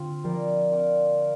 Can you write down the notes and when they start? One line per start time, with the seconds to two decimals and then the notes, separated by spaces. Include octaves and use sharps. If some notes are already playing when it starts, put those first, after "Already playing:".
Already playing: D3 C4 F4
0.24 F3 G3 A#3 G4 A#4
0.72 C4 A#4 D5 F5
1.20 A#4 F5